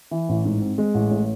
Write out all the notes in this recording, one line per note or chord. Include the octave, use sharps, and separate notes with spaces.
E3
A1
G#2
C4
G#3
A1
A2